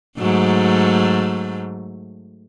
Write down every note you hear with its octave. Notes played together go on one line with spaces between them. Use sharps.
G#2 F#3 A3